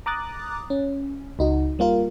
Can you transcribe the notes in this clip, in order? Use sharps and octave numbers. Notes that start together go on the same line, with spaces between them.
A#5 D6 D#6 F#6 A6
C#4
C#2 D#4 F#4
G3 A#3 F4 A#4